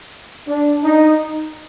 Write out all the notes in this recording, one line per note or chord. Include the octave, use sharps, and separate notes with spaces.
D4
D#4